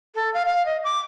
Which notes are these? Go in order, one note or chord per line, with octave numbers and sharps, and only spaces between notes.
A4
F5
F5
D#5
D6